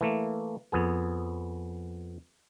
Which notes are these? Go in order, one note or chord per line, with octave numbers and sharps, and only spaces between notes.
E3 A3 A#3
F2 B3 G#4